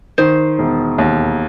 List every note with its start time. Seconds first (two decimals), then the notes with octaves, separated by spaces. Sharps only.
0.18 D#3 C5
0.59 E1
0.98 D#2